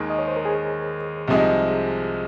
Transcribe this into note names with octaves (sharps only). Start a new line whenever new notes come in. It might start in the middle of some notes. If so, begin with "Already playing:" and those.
Already playing: D#2 D#3 G#3 G#4
D#5
C#5
C5
A#4
G#4
C2 C3 F3 G#3 D#4 G4
G#4